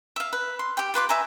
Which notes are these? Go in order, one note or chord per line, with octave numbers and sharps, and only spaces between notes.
E5 F5
B4
C6
G4 G5
F4 B4 C6 D6
B4 E5 G#5 A#5